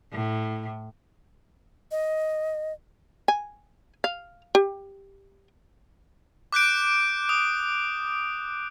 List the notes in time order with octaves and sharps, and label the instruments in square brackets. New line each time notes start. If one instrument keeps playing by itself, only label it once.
[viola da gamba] A2
[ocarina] D#5
[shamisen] G#5
F5
G4
[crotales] D6 F#6 G6 D7
D#6